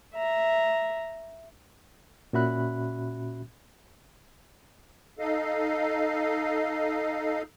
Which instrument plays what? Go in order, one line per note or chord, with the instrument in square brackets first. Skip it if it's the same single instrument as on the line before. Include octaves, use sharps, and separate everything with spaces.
[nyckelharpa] E5 A#5
[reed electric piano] A#2 C#4 F#4 E5 B5 F#6
[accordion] D#4 A4 D#5 F5